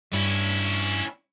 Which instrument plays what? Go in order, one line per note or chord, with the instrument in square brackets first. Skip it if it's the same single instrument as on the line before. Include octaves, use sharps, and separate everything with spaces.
[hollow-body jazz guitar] G2 [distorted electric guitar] C#4 E4